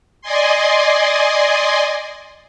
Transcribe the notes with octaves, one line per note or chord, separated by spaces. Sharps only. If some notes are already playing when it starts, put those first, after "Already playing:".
D5 D#5 G#5 C6